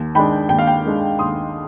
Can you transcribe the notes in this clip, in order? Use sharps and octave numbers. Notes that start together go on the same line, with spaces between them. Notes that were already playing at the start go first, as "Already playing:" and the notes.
Already playing: D#2
D#3 G#3 D4 G5 B5
D#2 G5
F5
G5
D#3 G#3 D4
D#2 C6 D#6